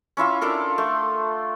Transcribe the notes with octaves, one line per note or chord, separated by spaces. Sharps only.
C#4 E4 F4 E5
D4 F4 A4 A#4
A3